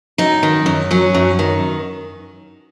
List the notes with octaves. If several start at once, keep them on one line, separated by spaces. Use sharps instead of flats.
F#2 D#4
D#3
F#2
F#3 C#4
F#2
D#3